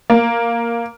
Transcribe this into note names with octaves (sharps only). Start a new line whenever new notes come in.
A#3